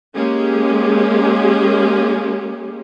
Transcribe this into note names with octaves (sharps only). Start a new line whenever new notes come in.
G#3 A#3 C#4 G4 G#4